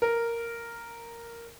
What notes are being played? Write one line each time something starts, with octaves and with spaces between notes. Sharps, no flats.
A#4